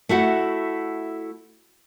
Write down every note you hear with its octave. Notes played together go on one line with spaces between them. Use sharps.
A3 E4 F#4 F#5